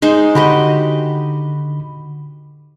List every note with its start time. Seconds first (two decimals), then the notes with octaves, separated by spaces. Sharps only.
0.02 G#3 D#4 C5
0.35 D3 F#4 G4 D#5 B5